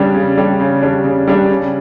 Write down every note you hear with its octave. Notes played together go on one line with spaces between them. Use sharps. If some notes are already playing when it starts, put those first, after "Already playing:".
Already playing: C#3 G3 D4
C#3
G3 D4
C#3
G3 D4
C#3
G3 D4
C#3